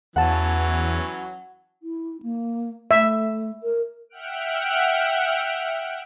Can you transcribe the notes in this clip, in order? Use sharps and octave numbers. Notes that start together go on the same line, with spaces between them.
E2 E3 F#3 C#4 F#5 A5
E4
A#3
A3 E5
A#4
E5 F#5 G5 F6 F#6 D7